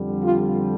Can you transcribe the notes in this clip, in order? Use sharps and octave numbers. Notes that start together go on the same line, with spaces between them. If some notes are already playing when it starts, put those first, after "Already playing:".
Already playing: F2 D3 G3
F4